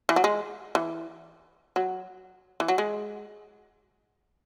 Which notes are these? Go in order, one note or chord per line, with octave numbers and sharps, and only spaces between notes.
E3
F#3
G#3
E3
F#3
E3
F#3
G#3